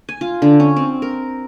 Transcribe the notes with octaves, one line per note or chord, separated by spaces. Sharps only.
G#5
F4
D3
C#4
C4
A#4